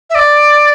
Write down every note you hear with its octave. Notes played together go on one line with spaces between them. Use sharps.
E5
D5